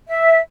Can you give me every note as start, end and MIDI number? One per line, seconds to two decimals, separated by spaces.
0.07 0.37 76